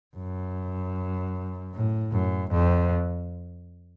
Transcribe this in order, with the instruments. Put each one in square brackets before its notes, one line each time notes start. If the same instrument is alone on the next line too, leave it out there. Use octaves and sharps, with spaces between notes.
[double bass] F#2
A2
F#2
F2